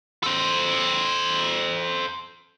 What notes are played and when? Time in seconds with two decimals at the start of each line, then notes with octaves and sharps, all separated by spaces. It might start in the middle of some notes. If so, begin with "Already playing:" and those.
0.23 A4 C5